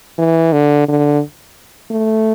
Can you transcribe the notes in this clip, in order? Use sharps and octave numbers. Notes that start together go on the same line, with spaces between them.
E3
D3
D3
A3